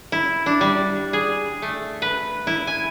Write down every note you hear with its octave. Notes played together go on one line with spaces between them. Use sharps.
E4
D4
G3
G#4
A3
B4
E4
G#5